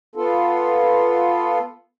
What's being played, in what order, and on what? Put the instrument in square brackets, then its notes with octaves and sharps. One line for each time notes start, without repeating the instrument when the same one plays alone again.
[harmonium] B3 F4 A4